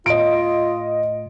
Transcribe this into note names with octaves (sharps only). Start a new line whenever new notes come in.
A2 F4 D#5 D7